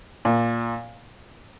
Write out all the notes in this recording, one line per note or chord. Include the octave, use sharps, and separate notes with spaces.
A#2